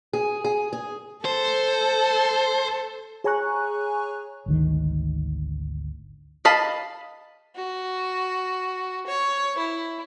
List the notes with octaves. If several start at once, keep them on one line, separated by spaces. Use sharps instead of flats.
G#4
G#4
G#4
A4 C5
G#4 C#5 G#5 A#5 C#6 F#6
G#1 D2 D#3
D#5 F5 A5 B5
F#4
C#5
E4